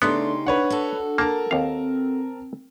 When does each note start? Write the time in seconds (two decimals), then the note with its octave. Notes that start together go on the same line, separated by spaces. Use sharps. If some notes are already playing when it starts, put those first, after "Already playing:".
0.02 C#3 A3 B3 D4 D#4 G4 C6
0.46 D4 B4 C#5 F#5
0.70 F#4 A4
1.18 A#3 A#4 A5
1.51 D#2 C4 F5